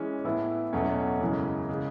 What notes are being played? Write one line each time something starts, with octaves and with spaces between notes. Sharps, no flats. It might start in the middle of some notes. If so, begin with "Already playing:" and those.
Already playing: E3 G#3 C#4
A2 E3 B3 E4 A4
E2 B2 F#3 A3 C#4
F#2 C#3 E3 G#3
C#3 G#3